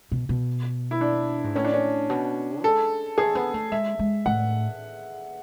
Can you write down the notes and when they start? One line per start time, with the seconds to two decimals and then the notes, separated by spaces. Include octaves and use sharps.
0.12 B2
0.29 B2
0.91 E4
1.01 D4
1.44 G#2
1.56 A2 C#4
1.64 D4
1.74 C#4
2.10 B2
2.64 G#3 A4
3.18 A3 G#4
3.35 B3
3.54 A3
3.72 G#3 E5
3.99 G#3
4.26 A2 F#5